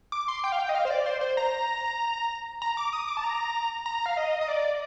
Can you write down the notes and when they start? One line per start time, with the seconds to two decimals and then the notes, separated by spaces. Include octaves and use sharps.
0.12 D6
0.28 C6
0.44 G5
0.52 F5
0.59 G5
0.69 D#5
0.75 F5
0.85 C5
0.90 D5
1.06 C5
1.21 C5
1.37 A#5
2.62 A#5
2.77 D6
2.93 D#6
3.08 D6
3.17 A5
3.24 A#5
3.86 A#5
4.06 F5
4.17 D#5
4.41 D#5
4.48 D5